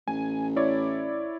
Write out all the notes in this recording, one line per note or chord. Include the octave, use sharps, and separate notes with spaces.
A1 G#5
E4 C#5 D5